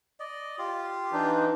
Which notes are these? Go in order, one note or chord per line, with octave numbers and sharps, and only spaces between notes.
D5 D#5
F4 G4
E3 D4 D#4